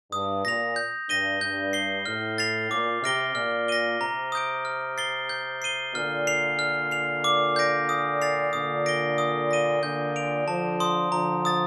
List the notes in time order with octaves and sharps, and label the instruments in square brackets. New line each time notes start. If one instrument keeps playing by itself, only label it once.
[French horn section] G2 [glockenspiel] D#6
[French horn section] A#2 [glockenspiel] A#6 F7
[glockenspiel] G6
[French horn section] G2 [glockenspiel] A#6 D#7 G7
[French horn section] G2 [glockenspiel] G6
[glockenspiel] C7 G7
[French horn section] A2 [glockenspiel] F6
[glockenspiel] A6 C7 F7
[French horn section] A#2 [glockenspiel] D6
[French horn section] C3 [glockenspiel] F6 A#6 D7 G7
[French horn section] A#2 [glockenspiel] F6
[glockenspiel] A#6 D#7 G7
[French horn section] C3 [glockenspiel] A#5
[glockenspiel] D#6 G6 D7
F6
A6 C7 G7
G6
C7 D#7 G7
[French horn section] A#2 D3 [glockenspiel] F6
[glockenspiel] C7 F7
F6
C7 F7
D6
G6 A#6 D7
D#6
A6 C7 F7
[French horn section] A#2 D3 [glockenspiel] D#6
[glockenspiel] A#6 D7 G7
D#6
A#6 D#7 G7
[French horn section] A#2 D3 [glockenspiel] G6
[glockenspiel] D7 F7
[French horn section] D3 F3 [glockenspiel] A5
[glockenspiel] C6 D#6
[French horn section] D3 F3 [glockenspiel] A#5
[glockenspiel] D#6 A6